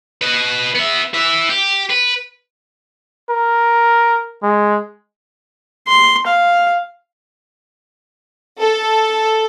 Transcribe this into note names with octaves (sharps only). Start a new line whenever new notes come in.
B4 D#5
B3 E5
E3 E5
G4
B4
A#4
G#3
C6
F5
A4